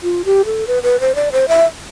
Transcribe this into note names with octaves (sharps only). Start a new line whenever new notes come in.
F4
G4
A4
B4
B4
C5
D5
C5
E5